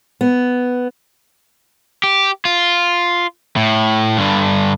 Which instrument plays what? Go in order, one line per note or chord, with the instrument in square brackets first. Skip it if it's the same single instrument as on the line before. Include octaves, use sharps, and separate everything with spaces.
[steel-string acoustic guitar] B3
[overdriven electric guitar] G4
F4
A2
G2 D3